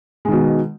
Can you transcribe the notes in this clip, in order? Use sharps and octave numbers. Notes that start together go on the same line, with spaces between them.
B2 D#3 G#3